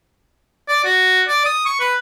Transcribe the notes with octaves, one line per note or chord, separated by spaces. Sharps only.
D5
F#4
D5
D#6
C#6
B4